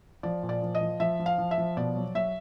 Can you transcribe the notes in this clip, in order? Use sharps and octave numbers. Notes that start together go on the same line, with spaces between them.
F3 D5
A#2
D5
F3
D#5
F3
F3 E5
F3
F5
F3
E5
F3
B2 D5
F#3
F#3 E5